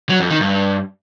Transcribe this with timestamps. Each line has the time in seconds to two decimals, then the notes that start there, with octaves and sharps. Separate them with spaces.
0.09 F#3
0.20 F2
0.30 D#3
0.41 G2